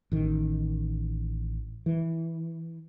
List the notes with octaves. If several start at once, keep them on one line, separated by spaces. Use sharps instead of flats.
A1 D#3
E3